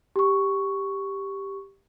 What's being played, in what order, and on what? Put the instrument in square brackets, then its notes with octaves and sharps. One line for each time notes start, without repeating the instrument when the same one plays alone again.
[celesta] G4 C#6